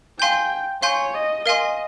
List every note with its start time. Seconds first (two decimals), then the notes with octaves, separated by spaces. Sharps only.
0.20 F5 G5 G#5 C6 G6
0.83 C#5 F5 G#5 C6 G6
1.14 D#5
1.46 A#4 D#5 F5 G#5 C6